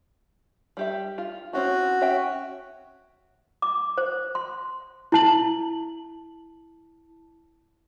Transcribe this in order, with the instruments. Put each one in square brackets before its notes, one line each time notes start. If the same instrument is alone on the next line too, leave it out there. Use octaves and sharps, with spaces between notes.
[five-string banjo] G3 G4 E5
F4
[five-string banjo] C4 C#4 E4 [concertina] F#4
[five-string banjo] C#4 E5 G5
[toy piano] D6
C5
C6
[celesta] E4 A5 F#7